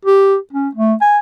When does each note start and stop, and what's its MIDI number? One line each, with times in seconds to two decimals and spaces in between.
0.05 0.37 67
0.53 0.69 61
0.75 0.94 57
1.01 1.19 80